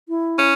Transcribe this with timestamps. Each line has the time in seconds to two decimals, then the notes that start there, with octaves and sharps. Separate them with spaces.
0.09 E4
0.39 C#4